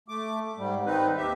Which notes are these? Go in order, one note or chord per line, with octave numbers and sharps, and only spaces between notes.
A3 D6
G#2 G3
D#3 C4 D#4 B4
D#2 G4 E5